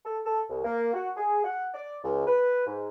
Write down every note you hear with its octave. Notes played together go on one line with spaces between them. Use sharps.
A4
A4
C2
A#3
F#4
G#4
F#5
D5
C#2
B4
G#2